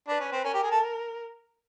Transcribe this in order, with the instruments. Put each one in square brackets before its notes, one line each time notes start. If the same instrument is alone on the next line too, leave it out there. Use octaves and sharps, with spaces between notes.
[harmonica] D4 [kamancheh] B4
[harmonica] C#4
C4
[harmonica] C#4 [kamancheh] A#4
[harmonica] G4
G#4
A4